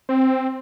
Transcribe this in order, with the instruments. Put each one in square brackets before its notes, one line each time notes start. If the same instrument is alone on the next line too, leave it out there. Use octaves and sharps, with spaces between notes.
[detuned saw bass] C4